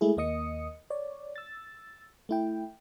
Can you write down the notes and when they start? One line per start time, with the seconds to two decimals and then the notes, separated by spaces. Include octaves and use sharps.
0.01 G#3 A3 E4 G#4
0.17 D#2 A#3 D#5 D#6 C#7
0.90 C#5 D5
1.36 E6 A6
2.29 A3 E4 G5